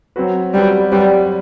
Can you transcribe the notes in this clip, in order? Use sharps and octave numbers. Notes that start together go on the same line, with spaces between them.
F#3 C4 F#4 B4
F#3 G3 C4 F#4 B4
F#3 G3 C4 F#4 B4